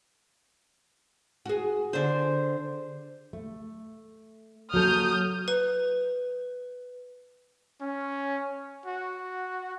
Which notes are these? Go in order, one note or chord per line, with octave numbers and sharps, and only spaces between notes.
F#4 G#4
D3 C5
A3
F#3 A#3 A4 D#6 F6 G6
B4
C#4
F#4